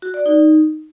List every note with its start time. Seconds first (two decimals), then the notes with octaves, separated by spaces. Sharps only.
0.02 F#4
0.14 D5
0.26 D#4